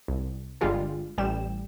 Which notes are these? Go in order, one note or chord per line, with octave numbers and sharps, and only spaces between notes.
C2
G1 D3 G3 G#3 F4 G#4
A1 G3 G5 E7